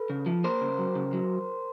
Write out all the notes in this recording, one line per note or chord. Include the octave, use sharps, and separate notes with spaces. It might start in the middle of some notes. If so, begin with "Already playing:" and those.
Already playing: A4 B4
C#3
F3
A#3 A#4 C5
C#3
F#3
C#3
F#3